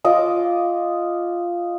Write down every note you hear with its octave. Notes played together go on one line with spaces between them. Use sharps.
F4 D#5 D6